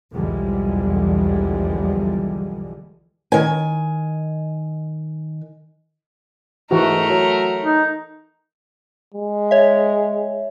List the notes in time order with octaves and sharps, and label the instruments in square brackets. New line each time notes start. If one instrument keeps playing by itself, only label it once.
[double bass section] B1 E2 D3 F3 G3 G#3
[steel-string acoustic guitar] D#3 G#5
[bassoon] G#2 [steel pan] E3 F#4 [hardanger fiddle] A3 A#4
[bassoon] F#3
[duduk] D#4
[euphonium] G#3
[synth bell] C#5 E5